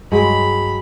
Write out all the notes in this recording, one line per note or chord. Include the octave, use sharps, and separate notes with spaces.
G2 F#3 G#3 C4 B5